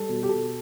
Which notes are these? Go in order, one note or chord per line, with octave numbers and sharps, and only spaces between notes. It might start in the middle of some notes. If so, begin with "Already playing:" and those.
Already playing: G3 A4
B2
G4
B2 A4